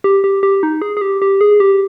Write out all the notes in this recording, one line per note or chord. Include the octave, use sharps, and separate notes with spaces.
G4
G4
G4
D#4
G#4
G#4
G4
G4
G#4
G4